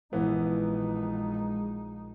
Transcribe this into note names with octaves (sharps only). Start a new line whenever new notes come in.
A#1 E3 G#3 B3 D#4